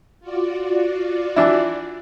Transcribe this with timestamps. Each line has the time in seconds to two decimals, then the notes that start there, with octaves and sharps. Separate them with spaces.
0.20 F4 F#4 D5
1.36 E3 D4 E4